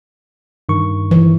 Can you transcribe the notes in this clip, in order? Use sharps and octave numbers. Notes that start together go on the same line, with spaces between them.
G2 D#3 C#6
E3